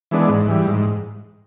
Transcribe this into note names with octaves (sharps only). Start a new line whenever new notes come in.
E3 G#3 B3 D4
G#2
E3 G3
G#2